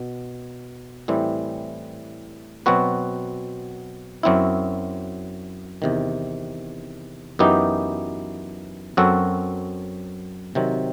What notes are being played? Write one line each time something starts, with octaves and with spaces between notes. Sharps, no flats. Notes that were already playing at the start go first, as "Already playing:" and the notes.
Already playing: B2
A2 E3 G3 C4
B2 F#3 C4 F#4 B4
F#2 F#3 C4 E4
E2 C3 D#3
F#2 E3 B3 D#4 G4
F#2 F#3 C4 F#4 A4
C3 D#3 F#3 C4